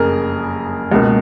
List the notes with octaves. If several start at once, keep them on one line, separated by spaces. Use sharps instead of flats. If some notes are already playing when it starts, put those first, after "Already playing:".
Already playing: F#1 F2 C#3 G#4 A#4
C#2 B2 A#3